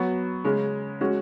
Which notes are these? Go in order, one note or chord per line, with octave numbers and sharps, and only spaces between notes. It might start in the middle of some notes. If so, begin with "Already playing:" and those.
Already playing: F#3 B3 F#4
C#3 G#3 C#4
G#3 C#4 F#4